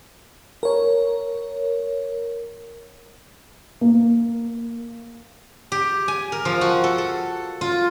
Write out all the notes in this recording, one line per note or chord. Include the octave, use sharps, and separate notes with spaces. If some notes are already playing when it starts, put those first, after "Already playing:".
A#4 C#5
A#3
G4
G#5
A#4
F3
F#4
A4
A4
F4